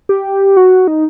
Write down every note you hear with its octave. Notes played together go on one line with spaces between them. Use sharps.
G4
F#4
D#4